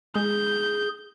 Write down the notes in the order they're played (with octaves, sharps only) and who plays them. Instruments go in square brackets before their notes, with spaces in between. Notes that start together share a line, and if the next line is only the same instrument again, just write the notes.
[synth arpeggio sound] G#3 [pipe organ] G#4 [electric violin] G6